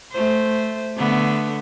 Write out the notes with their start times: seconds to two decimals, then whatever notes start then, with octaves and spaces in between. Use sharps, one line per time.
0.12 A3 C5
0.97 D3 A3 B3